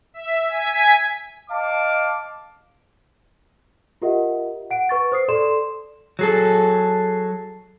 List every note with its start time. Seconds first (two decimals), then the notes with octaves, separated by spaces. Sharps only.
0.14 E5
0.48 G#5 B6
1.50 D#5 F5 A5 D6
4.02 F4 G4 A#4 D#5 E5 F#5
4.71 F#5 D7
4.89 B4 C#6 A6
5.12 C5 D#6 C7
5.28 A4 D5 C6 E7
6.19 F#3 G#4 A4